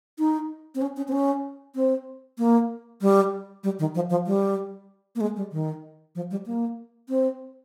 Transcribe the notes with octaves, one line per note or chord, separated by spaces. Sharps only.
D#4
C4
C#4
C#4
C4
C#4
C4
A#3
G3
G3
D#3
F3
F3
G3
A#3
G#3
G3
D#3
F3
G3
A#3
C4